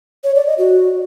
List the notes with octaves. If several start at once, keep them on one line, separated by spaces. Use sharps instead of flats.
C#5
D5
D#5
F#4